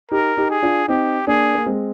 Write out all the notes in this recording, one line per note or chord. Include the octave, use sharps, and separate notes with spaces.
D#4 G4 A#4
D#4 G4
G#4
D4 F4
C4 D#4 G4
A#3 D4 G#4
A#3
G#3 C4